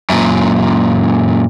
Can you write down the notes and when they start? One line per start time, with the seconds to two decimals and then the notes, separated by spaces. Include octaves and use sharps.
0.10 F#2 A#2